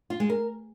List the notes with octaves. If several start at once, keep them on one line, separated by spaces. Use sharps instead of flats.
F4
G#3
A#4